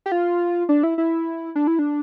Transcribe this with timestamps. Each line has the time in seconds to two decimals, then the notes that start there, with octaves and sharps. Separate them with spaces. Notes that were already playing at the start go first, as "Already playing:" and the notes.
0.06 G4
0.12 F4
0.69 D4
0.83 E4
0.98 E4
1.56 D4
1.67 E4
1.79 D4